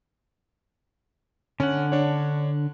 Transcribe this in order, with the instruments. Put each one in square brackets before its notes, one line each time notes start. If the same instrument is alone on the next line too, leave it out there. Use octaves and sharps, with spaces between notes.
[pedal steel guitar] D3 F#5 [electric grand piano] C#4
[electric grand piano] D4 C#5